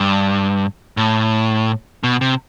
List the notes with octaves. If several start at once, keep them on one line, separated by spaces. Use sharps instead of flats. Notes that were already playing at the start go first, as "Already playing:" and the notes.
Already playing: G2
A2
B2
C3